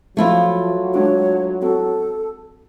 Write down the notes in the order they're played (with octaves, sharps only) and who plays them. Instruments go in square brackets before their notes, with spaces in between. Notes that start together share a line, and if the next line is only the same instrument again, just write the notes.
[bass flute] F3 [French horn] F#3 [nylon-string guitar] A3 E4 F4
[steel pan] G#3 D4 F#4 [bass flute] C#5
[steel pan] C4 F#4 [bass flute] A4